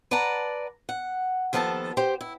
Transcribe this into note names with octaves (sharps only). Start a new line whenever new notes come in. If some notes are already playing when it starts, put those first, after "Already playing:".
B4 D5 F#5 A5 A#5
F#5
D#2 F3 B3 A4 D5 A5
G4 C5
E4